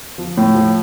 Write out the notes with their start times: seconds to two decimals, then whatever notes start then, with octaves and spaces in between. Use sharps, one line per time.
0.18 F3
0.37 A2
0.55 F3